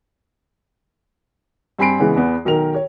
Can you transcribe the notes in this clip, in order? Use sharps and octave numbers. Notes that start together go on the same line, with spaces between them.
G2 C4 G#5 B5 C7 D7
C#3 E3 G#3 B3
E2 B3
B1 D#3 A#4 F7
C#5